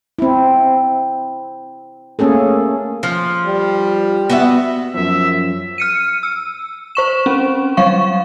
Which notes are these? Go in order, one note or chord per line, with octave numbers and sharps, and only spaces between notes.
C4 E4
A3 A#3 C#4 G#4 A4
F3
G3
B3 F#4 E5
F#2 F3 E5
F6 C#7 D#7
E6
C5 C#6 E7
C4 C#4
F#3 G3 F5 C#6